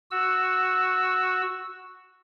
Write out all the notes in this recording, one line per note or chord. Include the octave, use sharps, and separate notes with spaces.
F#4 E6